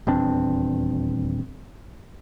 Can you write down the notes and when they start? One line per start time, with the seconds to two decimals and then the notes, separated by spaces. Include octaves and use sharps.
0.07 D#1 E2 C4 D4